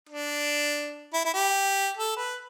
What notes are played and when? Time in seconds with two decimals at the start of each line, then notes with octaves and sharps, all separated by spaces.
0.10 D4
1.14 E4
1.25 E4
1.34 G4
1.97 A4
2.16 B4